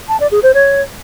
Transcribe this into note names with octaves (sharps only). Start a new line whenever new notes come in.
A5
D5
G#4
C5
C#5